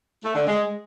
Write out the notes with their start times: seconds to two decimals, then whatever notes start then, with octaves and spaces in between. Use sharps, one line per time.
0.23 A3
0.35 D3
0.47 G#3